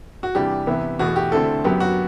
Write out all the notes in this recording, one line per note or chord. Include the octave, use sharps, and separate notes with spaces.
F#4
E2 C3 E3 G3 D4 G4
C3 E3 B3 E4
E2 B2 A3 F#4
G4
D2 D3 A3 C4 E4 A4
F#2 F#3 B3 G4
F#4